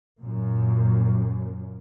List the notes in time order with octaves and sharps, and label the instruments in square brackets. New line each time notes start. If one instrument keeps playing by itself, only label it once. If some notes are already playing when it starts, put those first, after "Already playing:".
[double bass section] F#2 A#2